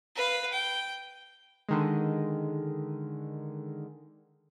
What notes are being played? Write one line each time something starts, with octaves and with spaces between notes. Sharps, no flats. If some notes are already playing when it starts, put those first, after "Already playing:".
B4 F5
G5
D3 D#3 G#3